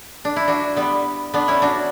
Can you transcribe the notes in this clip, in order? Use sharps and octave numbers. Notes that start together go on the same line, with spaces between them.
D4
E4
D4 F#4
G3 B3
B3 D4
C#4 E4
D4 F#4